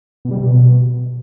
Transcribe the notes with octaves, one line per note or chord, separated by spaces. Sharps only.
B2
G3
C3
B2